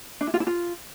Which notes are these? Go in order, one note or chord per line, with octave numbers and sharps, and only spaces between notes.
D4
E4
F4
E4
F4